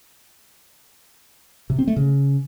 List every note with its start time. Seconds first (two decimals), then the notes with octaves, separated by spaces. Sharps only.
1.70 C3
1.79 C4
1.88 A3
1.96 C#3